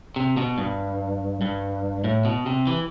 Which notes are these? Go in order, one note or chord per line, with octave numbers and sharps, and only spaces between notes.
C3
B2
G2
G2
A2
B2
C3
E3